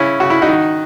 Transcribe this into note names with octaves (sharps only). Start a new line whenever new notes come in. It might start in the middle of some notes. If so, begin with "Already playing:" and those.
Already playing: C#3 C#4 E4
C#3 F#4
E4
D#4 F#4
D#3